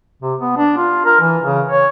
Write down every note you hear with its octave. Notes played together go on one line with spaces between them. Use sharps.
C3
B3
D4
F4
A#4
E3
C#3
C#5